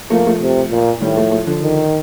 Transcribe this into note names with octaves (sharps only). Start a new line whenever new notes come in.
F3 A3 A#3
F3 A3
C3
A#2
A2 D#3 G3
F3 A3
F3 A3
D3 F3
D#3